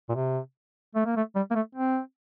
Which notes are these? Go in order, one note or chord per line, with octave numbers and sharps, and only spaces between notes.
A#2
C3
A3
A#3
A3
G3
A#3
A3
C4